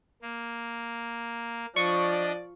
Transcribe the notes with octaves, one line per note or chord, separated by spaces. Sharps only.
A#3
F3 D4 D5 D#5 C#6